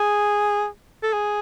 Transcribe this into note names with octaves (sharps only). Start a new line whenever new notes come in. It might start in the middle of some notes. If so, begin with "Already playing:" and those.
Already playing: G#4
A4
G#4